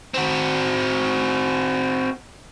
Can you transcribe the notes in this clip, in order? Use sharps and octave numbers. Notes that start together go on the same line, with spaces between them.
C4 F#4